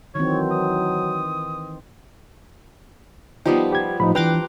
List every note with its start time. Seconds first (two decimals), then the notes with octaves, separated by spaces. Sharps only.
0.15 D#3 E3 F#3 C4 C#5
0.51 D#6
3.46 F3 G3 B3 D#4 G5 D#6
3.73 G4 G#6
4.00 A2 F3 D#4 B5
4.15 E3 D4 B4 G5 A#5 C6 D6 F#6